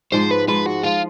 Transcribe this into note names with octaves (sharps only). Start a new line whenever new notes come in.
G#2 F3 G#3 C5
B4
G#2 F3 G#3 B4
F#4
F3 G#3 F4